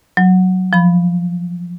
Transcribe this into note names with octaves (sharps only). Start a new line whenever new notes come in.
F#3
F3 B5